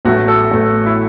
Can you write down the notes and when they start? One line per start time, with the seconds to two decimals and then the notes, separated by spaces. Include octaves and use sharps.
0.05 A1 A2 F#3 A3 F#4
0.28 A4
0.51 A1 A2 F#3 A3
0.86 E4